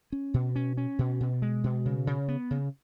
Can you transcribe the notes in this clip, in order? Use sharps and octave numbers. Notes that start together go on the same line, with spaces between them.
C#4
B2
C#4
C#4
B2
B2
G#3
B2
C#3
C#3
B3
C#3